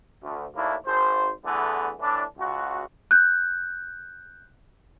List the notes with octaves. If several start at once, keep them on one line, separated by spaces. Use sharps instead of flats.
D2
D#2 A2 A#3 D4 E4
G#1 C5
E2 D3 E3 A3 B3
A2 E3 D4
C#2 F#4
F#6 G6